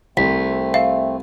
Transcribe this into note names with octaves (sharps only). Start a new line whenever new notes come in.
C2 A3 C4 B6
E5 F5